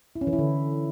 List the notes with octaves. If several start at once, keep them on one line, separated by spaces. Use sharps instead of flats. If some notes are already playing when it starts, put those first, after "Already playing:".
E4
C#4
E3
E4
D3